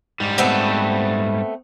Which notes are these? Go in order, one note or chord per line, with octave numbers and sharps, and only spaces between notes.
G#2 G3
A3 B3 C4